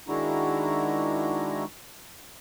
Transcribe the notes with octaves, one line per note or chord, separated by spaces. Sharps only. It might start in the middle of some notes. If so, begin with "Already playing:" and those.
D#3 G#3 D4 E4 F#4 A#5